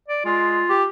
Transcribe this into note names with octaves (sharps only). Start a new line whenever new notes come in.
D5
G#3 F4
G4